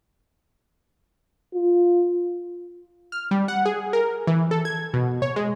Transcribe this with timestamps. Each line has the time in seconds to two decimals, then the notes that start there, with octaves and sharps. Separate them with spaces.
1.55 F4
3.12 F6
3.31 G3
3.48 F#5
3.66 G#4
3.93 A#4
4.27 E3
4.51 A4
4.65 G#6
4.94 B2
5.22 C#5
5.36 G#3